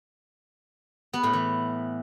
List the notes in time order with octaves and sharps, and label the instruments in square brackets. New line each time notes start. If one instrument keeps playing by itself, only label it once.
[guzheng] B3
A2
E3